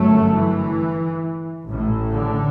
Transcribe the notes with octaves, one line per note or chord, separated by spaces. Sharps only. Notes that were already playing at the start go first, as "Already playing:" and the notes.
Already playing: G1 F#2 F#3 A3
E3
A1 A2
D3